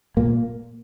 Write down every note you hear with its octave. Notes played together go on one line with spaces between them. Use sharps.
A#2 A#3